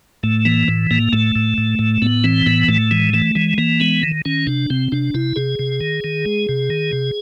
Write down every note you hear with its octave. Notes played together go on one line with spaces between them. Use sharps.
A2 A3
E3 A#3
A2
A2 A#3
A2 A3
A2
A2
A2
A2 B3
E3 C4
A2 B3
A2 A3
E3 G#3
E3 A3
E3 G#3
E3 A#3
G#3 B3
D#3
D#3 C#4
C3 D4
C3 C4
C3 D4
C3 E4
C3 G#4
C3
D#3
D#3
G#3
C3
D#3
C3